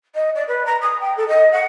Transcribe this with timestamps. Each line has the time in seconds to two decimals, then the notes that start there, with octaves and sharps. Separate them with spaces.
0.15 D#5
0.35 D5
0.48 B4
0.66 A#5
0.81 D#6
1.00 G5
1.17 A4
1.28 D#5
1.52 F#5